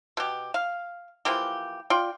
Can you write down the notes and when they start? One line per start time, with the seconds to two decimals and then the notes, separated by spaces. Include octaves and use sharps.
0.17 B2 G4
0.54 F5
1.25 E3 F3 A#3 G4
1.90 F4 D5 G5